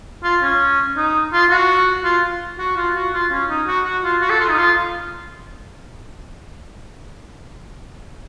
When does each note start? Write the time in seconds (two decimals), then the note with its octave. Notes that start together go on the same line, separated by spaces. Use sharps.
0.24 F4
0.43 C#4
0.97 D#4
1.33 F4
1.51 F#4
2.04 F4
2.59 F#4
2.77 F4
2.96 F#4
3.14 F4
3.32 C#4
3.50 D#4
3.67 F#4
3.85 F#4
4.04 F4
4.22 F#4
4.30 A4
4.40 F4
4.49 D#4
4.58 F4